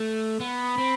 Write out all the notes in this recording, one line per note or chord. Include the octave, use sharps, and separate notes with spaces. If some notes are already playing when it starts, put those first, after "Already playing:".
Already playing: A3
B3 B5
C4